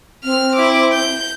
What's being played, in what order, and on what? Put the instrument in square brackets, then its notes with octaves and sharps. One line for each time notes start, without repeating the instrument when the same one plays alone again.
[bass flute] C4 [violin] F6
[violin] E4 D6
G6